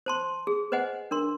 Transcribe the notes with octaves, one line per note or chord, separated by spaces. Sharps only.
C5 A5 C6
G#4
B4 C5 D#5 F#5 G#5
D4 A#4 C6